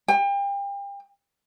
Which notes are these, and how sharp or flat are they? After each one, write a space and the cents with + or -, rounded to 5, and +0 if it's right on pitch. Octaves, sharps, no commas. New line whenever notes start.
G5 +35